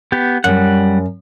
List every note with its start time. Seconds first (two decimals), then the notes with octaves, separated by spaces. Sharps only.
0.12 B3 G4
0.44 F#2 G3 F#5